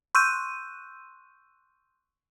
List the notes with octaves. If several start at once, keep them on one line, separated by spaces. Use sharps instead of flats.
C6 C#6 E6 F#6 G6 D#7